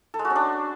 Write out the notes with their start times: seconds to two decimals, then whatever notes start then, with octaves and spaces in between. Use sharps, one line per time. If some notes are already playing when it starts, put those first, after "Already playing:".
0.14 A4
0.19 G#3
0.25 F#4
0.30 C#4
0.35 D4